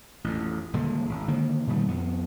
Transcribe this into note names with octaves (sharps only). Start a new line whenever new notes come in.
A1 F2
D#1 A#2 D3 G#3
G#1
D3 D#3 A#3
A#2 D#3 G3 A3
F2 B3